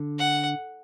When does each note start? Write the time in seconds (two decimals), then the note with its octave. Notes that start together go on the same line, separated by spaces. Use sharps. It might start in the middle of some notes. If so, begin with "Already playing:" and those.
Already playing: D3
0.19 F#5